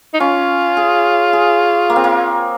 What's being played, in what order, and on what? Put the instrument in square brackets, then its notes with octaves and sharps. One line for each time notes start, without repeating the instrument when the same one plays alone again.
[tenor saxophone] D#4
[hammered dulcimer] C#4 [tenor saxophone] F4
[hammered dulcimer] G#4
G#4
A#3
C4
A#3